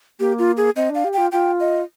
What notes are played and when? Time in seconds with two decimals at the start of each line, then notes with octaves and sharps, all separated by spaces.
0.19 A#3 G4
0.39 F4
0.57 G#4
0.75 C4 D#5
0.90 D4
0.95 F5
1.04 G4
1.13 F4 G5
1.32 F4 G5
1.60 D#5